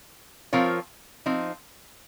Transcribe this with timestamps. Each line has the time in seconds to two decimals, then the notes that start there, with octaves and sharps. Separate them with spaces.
0.53 F3 C4 F4 A#4 C#5
1.26 F3 C4 D#4